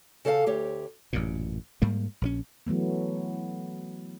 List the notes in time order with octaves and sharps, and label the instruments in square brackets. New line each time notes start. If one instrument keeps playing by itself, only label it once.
[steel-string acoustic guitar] C#3 A4 C#5 F5 A5
D2 G4 C#5
[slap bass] A1 F#2 A#2
G#2 G3 A#3
A#1 F3 C#4
[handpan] E3 F#3 A3 B3